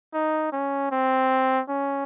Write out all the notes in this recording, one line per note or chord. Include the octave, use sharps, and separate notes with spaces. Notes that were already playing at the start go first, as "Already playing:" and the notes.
D#4
C#4
C4
C#4